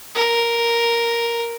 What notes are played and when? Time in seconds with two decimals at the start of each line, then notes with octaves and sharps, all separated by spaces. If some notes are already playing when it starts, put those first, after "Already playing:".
0.15 A#4